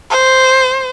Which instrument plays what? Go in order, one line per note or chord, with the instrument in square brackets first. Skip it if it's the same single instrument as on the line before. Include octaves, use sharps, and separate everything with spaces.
[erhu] C5